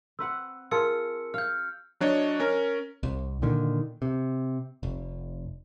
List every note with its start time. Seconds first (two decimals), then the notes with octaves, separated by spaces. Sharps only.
0.19 C4 B4 F#5 E6
0.71 F4 G#4 A#4 A5 E6 C#7
1.34 F5 F6 G6
2.00 F#3 D4 C#5 D#5
2.40 C#4 A#4
3.03 C2
3.42 A#2 D3 D#3
4.02 C3
4.83 F1